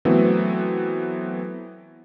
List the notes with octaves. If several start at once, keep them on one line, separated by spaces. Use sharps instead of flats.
E3 F#3 A3 B3 C4